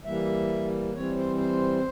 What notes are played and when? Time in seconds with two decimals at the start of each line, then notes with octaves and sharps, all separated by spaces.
0.05 E3 G3 A#3 E5
0.94 E3 G3 C4 C#5
1.17 C5
1.38 C5